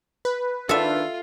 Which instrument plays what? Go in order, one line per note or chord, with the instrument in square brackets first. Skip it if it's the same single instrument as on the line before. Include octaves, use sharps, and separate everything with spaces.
[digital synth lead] B4
[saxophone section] D#3 D4 [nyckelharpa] F4 [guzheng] A4 E5